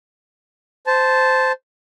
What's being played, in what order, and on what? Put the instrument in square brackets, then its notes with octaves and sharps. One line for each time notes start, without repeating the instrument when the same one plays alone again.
[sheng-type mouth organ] C5 A5